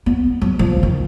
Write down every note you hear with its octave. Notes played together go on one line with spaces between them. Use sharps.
B3
F#3
F3
D#3